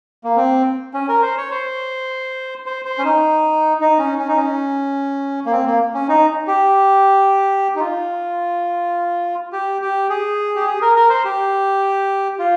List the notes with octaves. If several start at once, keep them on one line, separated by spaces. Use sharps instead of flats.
A#3
C4
C#4
A#4
C5
C#5
C5
C5
C5
C#4
D#4
D#4
C#4
C#4
D#4
C#4
A#3
C4
A#3
C#4
D#4
G4
D#4
F4
G4
G4
G#4
G4
G#4
A#4
A#4
C5
G4
F4